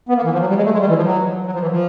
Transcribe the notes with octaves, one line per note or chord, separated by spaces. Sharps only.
B3
A#3
E3
F3
F#3
G3
G#3
A3
G#3
G3
E3
F3
F#3
F#3
F3
E3
F3